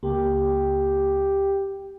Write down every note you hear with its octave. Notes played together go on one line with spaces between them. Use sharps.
C#2 A#3 G4